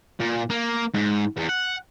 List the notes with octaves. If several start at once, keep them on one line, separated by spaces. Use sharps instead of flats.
A#2
A#3
G#2
E2
F#5